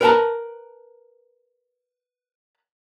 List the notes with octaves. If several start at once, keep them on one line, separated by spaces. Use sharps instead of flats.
A#4 B4 F#5 A5 A#5